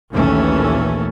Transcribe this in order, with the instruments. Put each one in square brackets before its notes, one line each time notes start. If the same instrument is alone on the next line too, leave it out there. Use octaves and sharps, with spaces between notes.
[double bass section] A#1 D#2 E3 A3 C#4